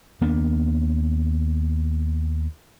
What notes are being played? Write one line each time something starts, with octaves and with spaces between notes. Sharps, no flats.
D#2 A#3 B3 D4